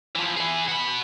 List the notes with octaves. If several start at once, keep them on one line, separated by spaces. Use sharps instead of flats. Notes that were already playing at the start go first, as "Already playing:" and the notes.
E3 F3
E3 G#4
F#4 B5